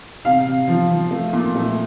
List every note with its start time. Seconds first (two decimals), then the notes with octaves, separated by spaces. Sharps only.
0.25 C3 F5
0.46 C3
0.68 F3
0.90 F3
1.11 A3
1.33 A#2
1.55 A3